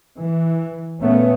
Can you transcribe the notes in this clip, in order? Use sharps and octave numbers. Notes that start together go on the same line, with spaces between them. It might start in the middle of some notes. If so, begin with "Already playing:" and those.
E3
A#2 A3 B3 C#4